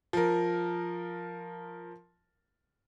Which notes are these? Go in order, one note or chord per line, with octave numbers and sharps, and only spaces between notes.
F3 A#4